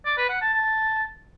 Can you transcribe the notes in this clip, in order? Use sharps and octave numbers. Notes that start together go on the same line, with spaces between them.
D5
B4
F#5
A5
A5